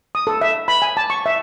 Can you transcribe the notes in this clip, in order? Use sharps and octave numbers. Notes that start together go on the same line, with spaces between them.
D#6
A4
E5
B5
G#5
A5
C#6
E5